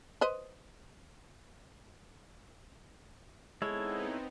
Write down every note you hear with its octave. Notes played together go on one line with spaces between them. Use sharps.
B4 C5 D#5
G#3 B3 C4 D#4 E4 A4 C#5